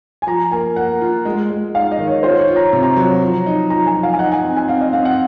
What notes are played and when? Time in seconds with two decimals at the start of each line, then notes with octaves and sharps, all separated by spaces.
0.22 G#5
0.27 F3 A#5
0.51 A#3 G#5
0.76 A#3 F#5
1.02 F4
1.25 G#3
1.50 G#3
1.74 D#4 F5
1.91 D#5
1.98 D#3
2.07 C#5
2.23 F4 C5
2.40 C#5
2.48 F4
2.56 A#5
2.73 C3
2.83 A#5
2.96 F#3
3.22 F3
3.46 D#4
3.70 F3 A#5
3.86 G#5
3.95 F3
4.03 F5
4.12 G#5
4.19 D#4 F#5
4.32 G#5
4.43 C4
4.57 G#5
4.68 C4 F5
4.81 D#5
4.93 C4 F5
5.05 F#5